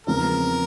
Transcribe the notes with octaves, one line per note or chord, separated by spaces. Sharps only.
E2 C#3 F3 G#3 C4 A#4